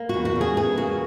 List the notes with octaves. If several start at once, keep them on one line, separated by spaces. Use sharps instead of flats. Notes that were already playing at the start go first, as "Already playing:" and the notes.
Already playing: A#3
E2 F#4
F#4
C#3
G#4
E3 G#4
A#3 F#4